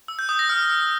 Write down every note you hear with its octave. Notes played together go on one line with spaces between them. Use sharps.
E6
G6
D#6
A#6
F6